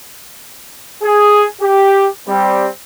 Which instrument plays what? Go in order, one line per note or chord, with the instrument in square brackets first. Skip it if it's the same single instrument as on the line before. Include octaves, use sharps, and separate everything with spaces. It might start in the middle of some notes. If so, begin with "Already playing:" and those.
[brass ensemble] G#4
G4
G3 C4